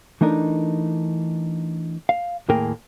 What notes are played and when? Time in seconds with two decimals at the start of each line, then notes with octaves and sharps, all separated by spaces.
0.21 E3 A3 D4 D#4 A#4
2.09 F5
2.49 D#2 A2 A#3 G#4 A#4 G5